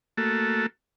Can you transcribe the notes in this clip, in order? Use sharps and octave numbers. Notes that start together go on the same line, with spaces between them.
A3 A#3 F#4 A4